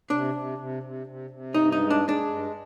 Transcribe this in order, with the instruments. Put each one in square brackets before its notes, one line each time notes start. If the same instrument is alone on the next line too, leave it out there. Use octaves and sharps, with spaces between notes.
[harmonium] C3 [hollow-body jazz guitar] D4
[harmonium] C3
C3
C3
C3
C3
[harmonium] G2 [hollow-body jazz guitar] D#4
[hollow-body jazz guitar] D#4
[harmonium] G#3
[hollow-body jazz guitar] D4
[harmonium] G#3
[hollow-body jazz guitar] D4
[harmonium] G2